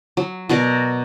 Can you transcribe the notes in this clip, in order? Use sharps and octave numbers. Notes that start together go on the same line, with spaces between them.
F#3
B2 F#4 A#4 D5